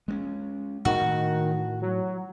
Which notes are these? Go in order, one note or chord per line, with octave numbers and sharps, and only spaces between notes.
G#3 A#3 C#4
A2 D#3 F#4
F#3